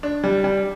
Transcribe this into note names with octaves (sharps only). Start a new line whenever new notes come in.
D4
G3
G3